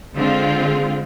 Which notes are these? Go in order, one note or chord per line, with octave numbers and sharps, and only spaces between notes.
D3 G#3 C4 F4